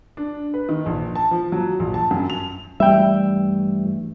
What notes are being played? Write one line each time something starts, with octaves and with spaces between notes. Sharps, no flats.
D4
B4
D#3
A#1
A5
F3
F#3
A#1
A5
F#2
F7
G2 E3 G3 A3 E5 G5